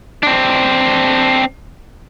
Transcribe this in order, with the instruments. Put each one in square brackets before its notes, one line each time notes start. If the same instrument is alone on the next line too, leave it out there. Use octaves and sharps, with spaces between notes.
[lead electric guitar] C4 D4